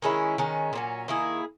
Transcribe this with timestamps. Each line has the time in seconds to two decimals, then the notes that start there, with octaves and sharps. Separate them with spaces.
0.02 D#3 G#3 C#4 E4
0.38 D#3 G#3 C#4
0.73 A#2 F#3 C#4
1.08 D#3 A#3 E4 G#4